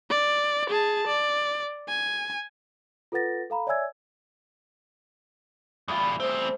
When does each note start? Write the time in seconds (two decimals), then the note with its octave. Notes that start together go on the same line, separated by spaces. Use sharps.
0.10 D5
0.70 G#4 A5
1.07 D5
1.89 G#5
3.12 F4 A4 B4 F#5 A6 A#6
3.50 A4 F5 A#5 B5
3.67 C#5 D5 E5 G#5 E6 G#6
5.88 E2 G3 A3 F4
6.20 E2 C4 C5